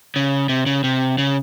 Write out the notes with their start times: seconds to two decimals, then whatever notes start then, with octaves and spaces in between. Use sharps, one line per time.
0.16 C#3
0.49 C3
0.66 C#3
0.84 C3
1.18 C#3